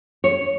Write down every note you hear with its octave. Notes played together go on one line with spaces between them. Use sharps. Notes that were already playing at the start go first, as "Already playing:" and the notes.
C#5